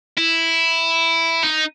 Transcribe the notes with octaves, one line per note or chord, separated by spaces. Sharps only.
E4
D#4